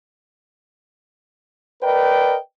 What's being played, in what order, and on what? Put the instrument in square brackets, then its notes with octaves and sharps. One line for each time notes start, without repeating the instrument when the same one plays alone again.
[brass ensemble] A#4 B4 D5 D#5 G5